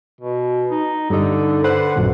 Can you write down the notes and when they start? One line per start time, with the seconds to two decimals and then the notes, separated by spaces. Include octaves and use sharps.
0.21 B2
0.71 D#4
1.10 G2 D3 D#4
1.64 D3 B4 C5 F#5
1.96 A1 F#2 A#2